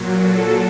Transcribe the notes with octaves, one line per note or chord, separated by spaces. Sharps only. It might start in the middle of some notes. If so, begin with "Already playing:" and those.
Already playing: A#2 F#3
A4